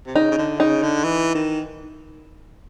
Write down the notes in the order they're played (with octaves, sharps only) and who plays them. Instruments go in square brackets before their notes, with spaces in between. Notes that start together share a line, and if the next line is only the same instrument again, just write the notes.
[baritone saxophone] C3
[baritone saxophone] C#3 [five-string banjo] D#4
[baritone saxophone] C#3
D3
[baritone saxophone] C#3 [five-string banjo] D#4
[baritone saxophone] D3
E3
D#3